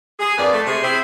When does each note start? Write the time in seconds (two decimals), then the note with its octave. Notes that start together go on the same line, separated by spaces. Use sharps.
0.20 G#4
0.37 F2 A#3 B4 D5
0.53 A3
0.67 C3 G#4
0.82 C4 E4 G#4 C5